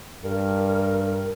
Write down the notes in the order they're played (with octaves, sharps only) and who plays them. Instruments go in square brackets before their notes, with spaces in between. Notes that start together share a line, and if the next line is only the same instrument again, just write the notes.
[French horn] G2 [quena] A#4